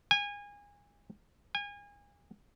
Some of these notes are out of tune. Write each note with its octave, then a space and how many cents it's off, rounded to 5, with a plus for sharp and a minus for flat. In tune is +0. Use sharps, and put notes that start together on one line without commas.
G#5 -25
G#5 -30